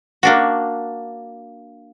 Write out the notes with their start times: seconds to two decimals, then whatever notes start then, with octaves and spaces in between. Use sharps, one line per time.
0.23 A#3 D4 F#4